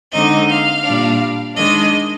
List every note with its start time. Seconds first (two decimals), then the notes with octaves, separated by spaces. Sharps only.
0.12 D3 G#3 C4 D#4 D#5
0.48 F5
0.84 A#2 G3 D4
1.55 D#3 G#3 D4 D#5